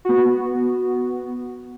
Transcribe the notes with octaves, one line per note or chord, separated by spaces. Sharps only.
B3 F#4